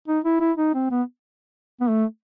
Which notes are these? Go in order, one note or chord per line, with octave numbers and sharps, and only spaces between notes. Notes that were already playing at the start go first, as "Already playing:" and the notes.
D#4
E4
E4
D#4
C4
B3
B3
A3